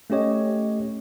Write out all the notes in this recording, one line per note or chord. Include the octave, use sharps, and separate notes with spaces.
A3 C#4 G4 C#5 D#5